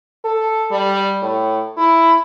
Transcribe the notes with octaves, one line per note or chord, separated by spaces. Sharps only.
A4
G3
A2
E4